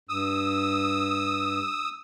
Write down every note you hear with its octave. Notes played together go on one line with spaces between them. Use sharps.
G2 D#6 E6